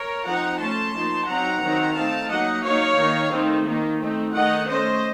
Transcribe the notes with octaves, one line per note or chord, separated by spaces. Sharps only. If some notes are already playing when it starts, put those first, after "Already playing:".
Already playing: A#4 C#5
F3 C4 D#4 F#5 A#5
A3 C#4 A5 C6
F3 A#3 D#4
F#3 C4 D#4 F#5 A#5
D#3 F#3 C4 D#4
A3 C4 D#4 F5 A5
F#3 A#3 D#4 D#5 F#5
F#3 A#3 D#4 C#5 F5
D#3 A#3 D#4
D#3 A3 C4 D#4
D#3 A#3 D#4
A3 C4 D#4
D#3 A3 D#4 D#5 F#5
A3 C#4 C5 D#5